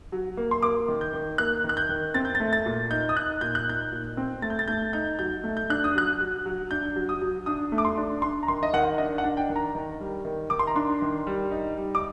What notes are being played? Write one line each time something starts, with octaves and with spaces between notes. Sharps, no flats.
F#3
A#3
C6
A#3 D6
D#3
G6
D#3
A#3 F#6
D#3
F#6
G6
D#3
C4 A6
G6
A6
A3
A6
A#2
D#4 G6
D#6
D#4 F#6
A#2 G6
F#6
D#4 G6
A#2
C4
A3 A6
G6
A6
A3 G6
D#4 G6
F#3 G6
A3
G6
D4 F#6
D#6
F#3 F#6
F#3
F#3
D4 G6
F#3
D#6
F#3
D4 D#6
A3
D6
C6
D4
D4 C6
A#5
D#3 C6
D#5
D#3 F#5
D4 D#5
F#5
D4
G5
D#3
A#5
D#3
G3
D#3
D#3 D6
C6
A#5
D4 C6
D#3
G3
D#4
G3
D6